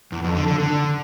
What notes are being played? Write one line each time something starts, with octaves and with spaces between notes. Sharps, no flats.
E2
F2
D3
D3
D3